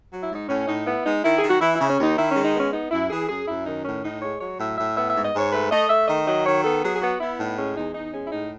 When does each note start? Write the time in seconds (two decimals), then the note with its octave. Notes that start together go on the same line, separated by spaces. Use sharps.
0.12 F#3
0.21 E4
0.31 G#2 D#4
0.49 A2 C#4
0.68 A2 D#4
0.87 B3 E4
1.05 G#3 D#4
1.24 D#3 E4
1.38 D#3 G#4
1.50 F#4
1.61 E3 E4
1.75 C#3 E4
1.89 C#4
1.99 D#2 D#4
2.17 D#3 E4
2.31 G#3 C#4
2.45 D#4
2.54 B3 C#4
2.73 B3 D#4
2.91 F#2 E4
3.10 E3 G#4
3.29 F#2 G#4
3.47 F#2 E4
3.66 D#3 D#4
3.85 A2 C#4
4.03 A2 D#4
4.22 G#3 C#5
4.41 F#3 C#5
4.59 A2 E5
4.78 A2 E5
4.97 B3 E5
5.10 G#2 E5
5.25 D#5
5.34 G#2 C#5
5.52 A3 B4
5.71 A3 D#5
5.90 A3 E5
6.08 D#3 D#5
6.27 F#3 D#5
6.46 D#3 C#5
6.64 B3 A4
6.83 F#3 G#4
6.96 G#4
7.02 B3 F#4
7.21 B3 E4
7.39 A2 D#4
7.58 G#3 C#4
7.76 E2 D#4
7.95 E2 D#4
8.13 G#3 C#4
8.27 E4
8.33 A2 D#4